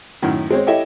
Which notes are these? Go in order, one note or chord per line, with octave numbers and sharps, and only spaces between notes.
F#2 A2 D#3
G#3 C4 C#5
E4 G4 A4 C#5 D#5 E5